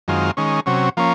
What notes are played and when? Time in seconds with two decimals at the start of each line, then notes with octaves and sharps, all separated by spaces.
0.08 F#2 D#3 G#3 C4 F4
0.37 D#3 G#3 C#4
0.66 C3 F#3 C#4
0.97 F3 A#3 C#4